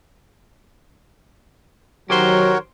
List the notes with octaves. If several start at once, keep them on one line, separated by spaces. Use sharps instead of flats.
D#3 F#3 F#4 G4 A#4 C5 C#5